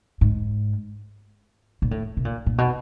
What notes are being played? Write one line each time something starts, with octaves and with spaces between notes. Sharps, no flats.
G#2
A#2
A2
B2
A#2
A#2
B2